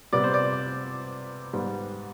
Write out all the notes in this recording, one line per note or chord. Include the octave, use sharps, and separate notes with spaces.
C3 G3 B3 D5
C5
D5
G#2 G3 B3